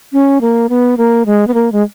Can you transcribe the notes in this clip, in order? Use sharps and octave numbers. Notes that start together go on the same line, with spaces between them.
C#4
A#3
B3
A#3
G#3
B3
A#3
G#3